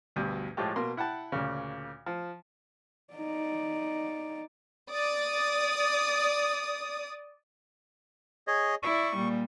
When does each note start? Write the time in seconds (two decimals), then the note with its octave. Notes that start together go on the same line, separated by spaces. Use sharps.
0.16 D2 G2 B2
0.57 A2 F3 G#3 A3 G4
0.76 B2 A#3 C6
0.97 E4 F#5 G5 A5
1.32 D2 A#2 C#3
2.06 F3
3.14 D#4 D5
4.92 D5 D#6
8.47 G#4 C#5 D#5
8.83 E4 D5 C#6
9.16 A#2 G3